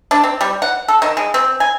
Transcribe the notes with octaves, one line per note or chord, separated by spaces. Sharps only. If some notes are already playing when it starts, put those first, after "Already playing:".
D4
C4
G3
F#5
A4
D#3
G#3
C4
G#5